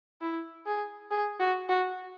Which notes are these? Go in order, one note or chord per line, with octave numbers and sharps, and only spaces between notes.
E4
G#4
G#4
F#4
F#4